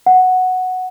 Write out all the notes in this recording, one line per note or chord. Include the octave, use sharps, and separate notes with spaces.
F#5